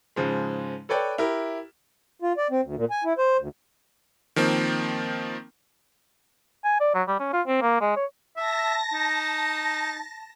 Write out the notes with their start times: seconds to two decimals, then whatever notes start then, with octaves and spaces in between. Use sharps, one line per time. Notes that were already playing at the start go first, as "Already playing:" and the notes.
0.16 G#2 C#3 F3 G#3
0.89 A4 B4 C#5 D5 G5
1.18 E4 G4 A#4
2.22 F4
2.37 D5
2.51 C4
2.63 D2
2.76 A#2
2.90 G#5
3.04 E4
3.18 C5
3.39 D2
4.36 D#3 F3 A#3 C4
6.64 G#5
6.80 D5
6.95 F#3
7.08 G3
7.19 C#4
7.33 F4
7.47 C4
7.62 A#3
7.81 G#3
7.96 C#5
8.37 E5 A5 A#6
8.93 D#4